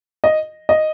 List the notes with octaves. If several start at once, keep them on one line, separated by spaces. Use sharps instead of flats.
D#5
D#5